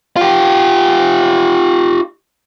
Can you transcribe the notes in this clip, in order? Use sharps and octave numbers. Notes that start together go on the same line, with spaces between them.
F4 G4